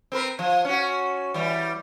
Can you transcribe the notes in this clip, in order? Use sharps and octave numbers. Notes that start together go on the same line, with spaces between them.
C4 A#4 B4
F3
C#4 F#4
E3 G3